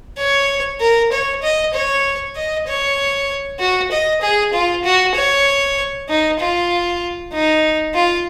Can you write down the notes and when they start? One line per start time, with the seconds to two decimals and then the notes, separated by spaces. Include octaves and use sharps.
0.18 C#5
0.80 A#4
1.12 C#5
1.43 D#5
1.74 C#5
2.35 D#5
2.67 C#5
3.59 F#4
3.91 D#5
4.21 G#4
4.53 F4
4.84 F#4
5.15 C#5
6.09 D#4
6.40 F4
7.33 D#4
7.95 F4